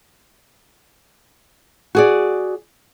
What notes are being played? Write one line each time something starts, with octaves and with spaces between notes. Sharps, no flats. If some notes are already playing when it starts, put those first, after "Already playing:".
F#4 G#4 D5